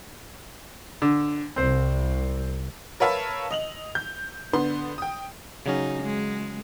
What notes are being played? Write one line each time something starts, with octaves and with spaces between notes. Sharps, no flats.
D3
C2 C4 C5
A#4 B4 C#5 E5 F5 A5
D#5 F7 F#7
G6
D3 B3 C6
G5 D#6
C#3 F#3 C#4 D#4
G#3